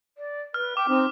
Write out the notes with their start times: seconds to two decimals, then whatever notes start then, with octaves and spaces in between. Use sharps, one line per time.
0.18 D5
0.54 B4 F6
0.77 G5 D6
0.89 C4 D#4